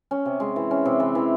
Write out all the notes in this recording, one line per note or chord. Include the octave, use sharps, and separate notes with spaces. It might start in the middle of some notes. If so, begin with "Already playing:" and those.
C#4
C3
G#3
E3
C#4
C3
E3
E3